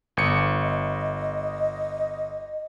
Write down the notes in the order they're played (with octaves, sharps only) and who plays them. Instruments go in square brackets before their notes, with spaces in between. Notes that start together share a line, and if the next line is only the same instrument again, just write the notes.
[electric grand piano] G1 C#7
[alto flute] D#5